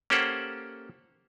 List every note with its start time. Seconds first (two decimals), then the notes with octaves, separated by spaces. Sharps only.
0.10 A#3 C#4 G4 A4 C5 F#5